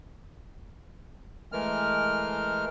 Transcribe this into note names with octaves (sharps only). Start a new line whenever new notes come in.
E3 G#3 A3 A#4 F6